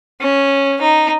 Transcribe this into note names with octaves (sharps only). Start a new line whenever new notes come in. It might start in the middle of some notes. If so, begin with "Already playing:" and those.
C#4
D#4